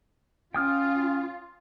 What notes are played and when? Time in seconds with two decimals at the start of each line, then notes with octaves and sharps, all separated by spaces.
0.54 C#4 F4 G5 D#6 F6